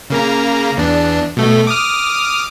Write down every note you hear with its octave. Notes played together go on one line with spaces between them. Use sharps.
C#3 A#3 A#5
E2 D4
B2 A3
D6 D#6 F6